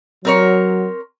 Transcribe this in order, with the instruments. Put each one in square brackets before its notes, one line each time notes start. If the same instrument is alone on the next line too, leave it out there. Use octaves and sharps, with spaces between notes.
[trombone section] F#3 [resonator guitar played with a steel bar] C4 A#4 C#5